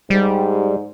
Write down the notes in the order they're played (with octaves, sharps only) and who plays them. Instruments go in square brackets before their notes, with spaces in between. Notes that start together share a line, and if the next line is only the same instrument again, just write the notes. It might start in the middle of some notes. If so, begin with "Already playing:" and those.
[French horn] G#2 [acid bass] G3